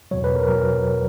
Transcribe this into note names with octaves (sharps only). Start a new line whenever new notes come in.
E2 B2 F#3 C#5
B4
A#4
B2 F#3 A#4